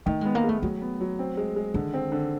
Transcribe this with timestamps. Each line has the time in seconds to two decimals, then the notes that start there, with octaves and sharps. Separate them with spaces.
0.06 D#3 A3
0.21 G#3 B3
0.35 A#3
0.44 G#3
0.49 A3
0.62 F#3 A3
0.81 B3
1.00 F#3
1.19 C4
1.37 G#3
1.56 G#3
1.74 D3 D#3
1.94 C4
2.12 D3